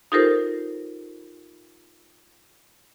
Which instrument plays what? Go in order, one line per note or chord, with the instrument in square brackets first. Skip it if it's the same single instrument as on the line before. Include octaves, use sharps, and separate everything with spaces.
[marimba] D#4 F4 G4 A4 A#4 C5